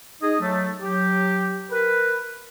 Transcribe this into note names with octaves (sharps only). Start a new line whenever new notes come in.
D#4 G#4 D#5
F#3 A3
F#3 G4
A#4 B4